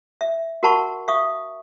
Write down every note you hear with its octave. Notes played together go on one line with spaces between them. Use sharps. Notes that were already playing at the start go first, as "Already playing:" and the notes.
E5
F#4 A#4 F#5 A5 B5 C#6
E5 F5 C#6 D#6